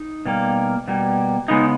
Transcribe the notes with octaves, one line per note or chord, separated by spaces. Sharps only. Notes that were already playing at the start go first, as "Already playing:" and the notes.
Already playing: D#4
B2 G3 A#3
B2 G3 A#3
C#3 G#3 B3 D#4